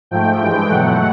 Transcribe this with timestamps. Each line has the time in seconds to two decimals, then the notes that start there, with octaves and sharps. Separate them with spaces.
0.11 G#2 F3 A3 G5
0.40 G2 E3 G#3
0.69 B2 F#3 A3 F#5